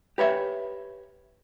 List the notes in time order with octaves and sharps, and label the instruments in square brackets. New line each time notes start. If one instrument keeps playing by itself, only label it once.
[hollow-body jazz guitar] G4 B4 C#5 E5